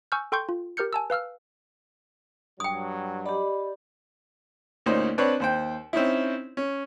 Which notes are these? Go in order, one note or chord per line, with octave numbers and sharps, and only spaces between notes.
G#5 C#6 E6 F6 G6
A4 G5 C6 C#6 G6
F4
G4 A#4 F6 G6 C#7
G#5 A5 E6
B4 F5 E6 F6
G2 F#3 G5 D#6
G4 D5 D#5 B5
D2 A#2 C#4 D#4 C5
C4 D4 B4 C#5
D#2 C5 G5
C4 C#4 D#4 E4
C#4